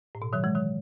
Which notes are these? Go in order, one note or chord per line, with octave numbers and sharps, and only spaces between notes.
A2
B2
D#3 F#3
E3 G#3
D#3 F#3